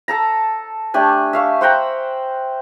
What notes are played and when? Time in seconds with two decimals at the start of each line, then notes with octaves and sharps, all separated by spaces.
0.08 A4 A5 A#5
0.94 A3 D4 G4 G#5
1.33 E5 F5 C#6
1.61 C5 F#5 G5 A#5